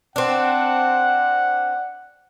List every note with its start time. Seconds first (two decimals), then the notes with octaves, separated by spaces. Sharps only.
0.16 C4 D4 F#5